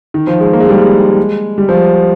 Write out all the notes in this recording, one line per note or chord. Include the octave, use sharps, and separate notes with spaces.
D#3
F3
G#3
A#3
G#3
G3
G#3
G3
F3